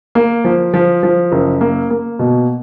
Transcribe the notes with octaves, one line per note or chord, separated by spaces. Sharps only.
A#3
F3
F3
F3
F#1
A#3
A#3
B2